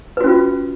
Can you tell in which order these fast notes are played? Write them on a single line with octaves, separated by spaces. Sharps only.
B4 F#4 C#4 F4